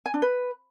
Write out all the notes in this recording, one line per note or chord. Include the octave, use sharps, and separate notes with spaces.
G#5
D4
B4